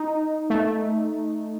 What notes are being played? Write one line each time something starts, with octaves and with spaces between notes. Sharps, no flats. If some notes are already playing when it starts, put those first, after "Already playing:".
Already playing: D#4
A3